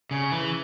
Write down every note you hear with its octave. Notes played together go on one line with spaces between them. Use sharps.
C#3
E3